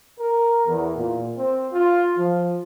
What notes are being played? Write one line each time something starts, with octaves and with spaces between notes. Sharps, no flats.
A#4
E2
A#2
C4
F4
F3